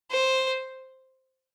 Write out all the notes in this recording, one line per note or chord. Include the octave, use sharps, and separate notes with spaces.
C5